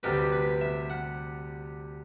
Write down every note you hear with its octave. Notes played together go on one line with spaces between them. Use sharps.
D2 C3 G3 B4
B4
E5
F#5